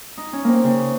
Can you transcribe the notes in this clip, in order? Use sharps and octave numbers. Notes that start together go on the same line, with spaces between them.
D#4
C#4
A#3 C4
C#3